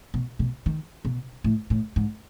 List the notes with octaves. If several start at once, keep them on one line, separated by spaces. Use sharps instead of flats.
B2
B2
D#3
B2
A2
A2
G#2